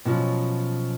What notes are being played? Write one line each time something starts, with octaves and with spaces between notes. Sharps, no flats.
B2 F3 F#3 C#4